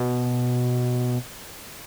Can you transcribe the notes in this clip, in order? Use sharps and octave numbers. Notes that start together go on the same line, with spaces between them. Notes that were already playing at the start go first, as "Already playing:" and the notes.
Already playing: B2